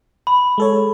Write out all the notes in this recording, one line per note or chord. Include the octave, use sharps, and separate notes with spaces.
B5
G#3 A4 C#5